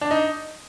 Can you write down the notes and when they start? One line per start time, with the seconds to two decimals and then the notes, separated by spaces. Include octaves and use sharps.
0.01 D4
0.11 D#4